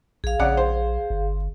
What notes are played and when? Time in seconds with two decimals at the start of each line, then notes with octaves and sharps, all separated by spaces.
0.24 A#1 G#4 F5
0.39 A#1 C#3 D5 F#5
0.57 C5
1.10 G1